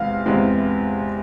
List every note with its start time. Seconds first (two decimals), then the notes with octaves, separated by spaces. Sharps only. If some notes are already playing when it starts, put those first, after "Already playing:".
Already playing: E2 C3 E3 G#3 C4 F5
0.25 E2 C3 E3 G#3 C4